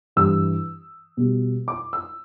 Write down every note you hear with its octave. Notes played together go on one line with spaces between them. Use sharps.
G2 E3 G3 E6
B2 G3
D6
E6